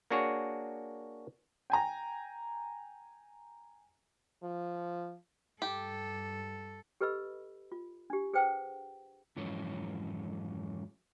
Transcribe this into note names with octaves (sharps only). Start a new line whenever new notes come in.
A#3 D4 F#4 G#4 C#5
G5 G#5 A#5
F3
G2 G4 A4
G4 A4 B4 D#5 B5 E6
F4
D4 G4
G#4 B4 C5 F#5 G5
F2 G#2 E3 F#3 C#4